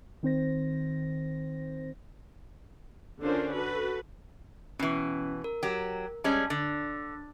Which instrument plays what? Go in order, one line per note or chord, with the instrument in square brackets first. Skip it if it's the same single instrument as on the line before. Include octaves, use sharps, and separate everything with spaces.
[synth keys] D#3 C4 C5 A#6
[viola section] D3 C#4 D4 F4 A#4 C5
F#4 A4 B4
[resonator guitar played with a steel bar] B2 E3 [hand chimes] C#4
[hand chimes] A#4
[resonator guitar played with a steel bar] F#3 G4
[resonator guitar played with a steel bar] G3 G#3 C#4 [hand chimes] A5
[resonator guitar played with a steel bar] D3 [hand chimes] A6